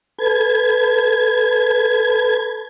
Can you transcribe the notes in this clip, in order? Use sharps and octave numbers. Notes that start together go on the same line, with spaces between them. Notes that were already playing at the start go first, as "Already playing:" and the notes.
A4 B4 G#6